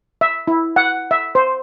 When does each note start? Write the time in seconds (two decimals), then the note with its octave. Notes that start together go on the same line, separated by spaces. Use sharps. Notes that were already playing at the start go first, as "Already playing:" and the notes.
0.21 E5
0.47 E4
0.76 F#5
1.11 E5
1.35 C5